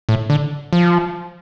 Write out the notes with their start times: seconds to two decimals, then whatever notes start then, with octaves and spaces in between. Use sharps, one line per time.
0.09 A2
0.30 D3
0.73 F3